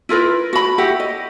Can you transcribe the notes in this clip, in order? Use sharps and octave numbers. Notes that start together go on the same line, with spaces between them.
E4 F4 A#4 B4
F#4 B5
E4 F#4 G4 F#5
D#5